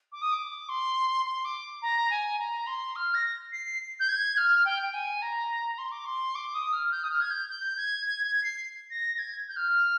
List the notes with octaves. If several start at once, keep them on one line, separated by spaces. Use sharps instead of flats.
D6
D#6
D6
C6
C6
D6
A#5
G#5
A#5
C6
F6
A#6
C7
G6
G#6
F6
G5
G5
G#5
A#5
C6
D6
C6
D6
D#6
F6
G6
D#6
F6
G#6
G6
G6
G#6
G#6
G#6
C7
A#6
A#6
G#6
G6
F6